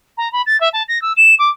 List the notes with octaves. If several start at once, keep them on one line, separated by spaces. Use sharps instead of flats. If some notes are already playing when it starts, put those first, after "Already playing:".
A#5
B5
A6
E5
A5
A#6
E6
E7
D6